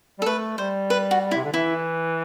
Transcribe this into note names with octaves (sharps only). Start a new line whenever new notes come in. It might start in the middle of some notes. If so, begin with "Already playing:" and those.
G3
A4
A3 B4
G3 C5
B4
F#4
E4
C3
D3
E3 E4